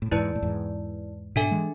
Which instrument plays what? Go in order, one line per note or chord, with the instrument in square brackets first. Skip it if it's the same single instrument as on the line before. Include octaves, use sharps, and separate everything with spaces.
[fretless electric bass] A2
[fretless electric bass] E2 G#2 [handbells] E4 B4 D5 A5
[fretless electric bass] A2
E2 G#2
[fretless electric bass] G#2 B2 [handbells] D4 A4 E5 G#5
[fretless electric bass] E3 G#3